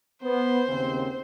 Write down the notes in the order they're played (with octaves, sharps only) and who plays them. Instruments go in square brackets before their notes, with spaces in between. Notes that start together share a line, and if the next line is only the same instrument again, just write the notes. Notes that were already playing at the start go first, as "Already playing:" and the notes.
[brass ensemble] B3 [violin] C5
[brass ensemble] D#2 C#3 C4